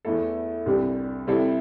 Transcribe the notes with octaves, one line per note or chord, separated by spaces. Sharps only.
E2 E3 A3 E4 A4
C2 C3 G3 D4 G4
C3 G3 C4 E4 A4